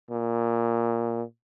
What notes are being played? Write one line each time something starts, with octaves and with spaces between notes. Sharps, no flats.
A#2